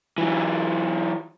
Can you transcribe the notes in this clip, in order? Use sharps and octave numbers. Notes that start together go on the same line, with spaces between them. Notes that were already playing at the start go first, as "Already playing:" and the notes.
E3 F#3